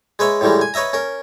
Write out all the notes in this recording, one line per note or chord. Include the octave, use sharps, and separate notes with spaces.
G#3 B4 C#5 E5
A2 D#3 E3 G3 G#3
G#5
B4 C#5 D#5 E5 A#5
C#4 A#4